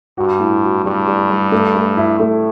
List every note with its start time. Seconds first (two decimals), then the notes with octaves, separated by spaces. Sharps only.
0.18 G2 F#4
0.40 A2
0.63 F#4
0.84 G2 G3
1.07 G3
1.30 G3
1.52 A3
1.75 A3
1.97 E4
2.20 A2 A3